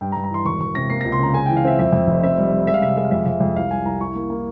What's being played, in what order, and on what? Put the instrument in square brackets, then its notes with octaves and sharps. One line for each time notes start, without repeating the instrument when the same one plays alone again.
[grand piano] G2 G5
A#5
G2
A#5
E3 C6
E1 C#6
E1 C#6
C3 A#6
A#3 C7
C#2 A#6
C6
C#3 A#5
G#3 G#5
E3 G5
F5
C4 E5
F2 E5
F2
F1
C4 E5
G3
G3
G#3 E5
F5
C3 E5
F5
G#3 E5
F5
F2 E5
F5
F2 E5
F2
C2 F5
G3 G#5
C2 A#5
E4 C#6
A#3
A#3